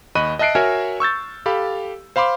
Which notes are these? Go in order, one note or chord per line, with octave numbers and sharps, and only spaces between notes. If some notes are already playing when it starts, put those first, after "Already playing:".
D#2 D#5 B5 C#6 F#6 D#7
D#5 E5 A5 F#6 C7 D7
F#4 A#4 C#5 E5 G#5 F6
C#6 E6 G6 A6
G4 A4 F5 B5
C5 F5 B5 C6 D6